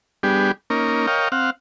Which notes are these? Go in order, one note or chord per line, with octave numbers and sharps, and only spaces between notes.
G3 B3 D4 G4 G#4
A#3 C#4 D#4 A#4
A#4 C#5 D#5 F5 G5
C4 F5 F#5